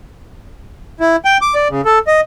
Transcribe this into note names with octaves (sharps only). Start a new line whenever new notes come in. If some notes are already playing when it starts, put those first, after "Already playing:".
E4
G5
D6
D5
C#3
A4
D#5